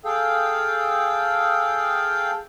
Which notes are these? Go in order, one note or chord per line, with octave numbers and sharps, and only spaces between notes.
G#4 A4 F5 G5